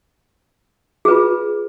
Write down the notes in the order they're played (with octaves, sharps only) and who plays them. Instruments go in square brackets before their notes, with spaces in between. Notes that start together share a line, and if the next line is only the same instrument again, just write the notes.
[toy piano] G#4
B4
F4